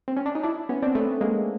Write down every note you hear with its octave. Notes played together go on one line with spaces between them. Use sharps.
C4
C#4
D4
D#4
D4 E4
B3 C#4
C4 D4
A3 B3
G#3 A#3